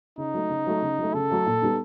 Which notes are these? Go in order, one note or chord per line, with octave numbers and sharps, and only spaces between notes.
C#3 D#4
F#3 A3
C#3
F#3 A3
C#3
F#3 A3
C#3 A4
F#3 A3
A#2
G3 B3 D#4